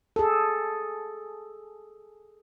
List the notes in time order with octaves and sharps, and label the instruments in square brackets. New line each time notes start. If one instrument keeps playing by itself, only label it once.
[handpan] G#4 A4